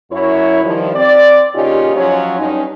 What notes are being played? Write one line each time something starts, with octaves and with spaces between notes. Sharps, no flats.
F#2 E4 C#5
G2 D#3 F3
C4 D5
A#2 C#3 C#4 D#4 F4 G4
F3 F#3 C#4 C#5
G2 C#4 D#4